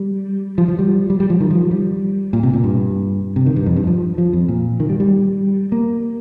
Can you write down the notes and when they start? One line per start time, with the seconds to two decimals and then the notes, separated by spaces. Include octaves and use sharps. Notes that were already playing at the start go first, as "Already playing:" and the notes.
Already playing: G3
0.58 F3
0.68 F3
0.79 G3
1.10 G3
1.20 G3
1.30 F3
1.41 D#3
1.51 F3
1.71 G3
2.33 A#2
2.43 C3
2.53 A#2
2.64 G2
3.36 C3
3.46 D#3
3.56 G2
3.66 F2
3.77 G2
3.87 F3
4.18 F3
4.33 F2
4.49 A#2
4.80 D#3
4.89 G3
5.00 G3
5.72 A#3